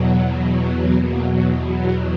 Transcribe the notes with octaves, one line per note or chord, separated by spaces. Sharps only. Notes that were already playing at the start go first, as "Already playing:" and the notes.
Already playing: E2 B2 F#3
E2 B2 F#3 A#3
B3